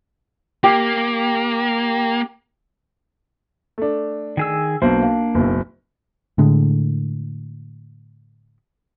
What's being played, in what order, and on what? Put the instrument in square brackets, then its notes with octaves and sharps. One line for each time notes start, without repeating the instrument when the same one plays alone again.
[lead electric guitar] A#3 [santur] G4
[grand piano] A3 D4
[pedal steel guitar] D#3 G#4 E6
[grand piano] B1 C5 [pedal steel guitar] A#3 D4
[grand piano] F5
F#1 B1
[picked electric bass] A2 D3 G#3